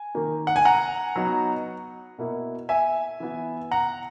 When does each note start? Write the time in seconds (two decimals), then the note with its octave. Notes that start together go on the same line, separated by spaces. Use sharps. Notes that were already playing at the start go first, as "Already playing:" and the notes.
Already playing: G#5
0.15 D#3 A#3 D#4
0.47 F#5
0.56 G#5
0.65 F#5 A#5
1.16 F#3 B3 D#4
2.18 B2 A#3 E4
2.69 E5 G#5
3.20 E3 B3 E4
3.71 F#5 A#5